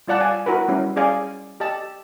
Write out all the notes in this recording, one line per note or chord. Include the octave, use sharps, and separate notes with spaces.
G3 F4 D5 F#5 A5
D5 F5 G#5
E4 F#4 A#4 B4
G3 C#4 E4
C#4 G#4 D5 F5 G#5
G4 D#5 A5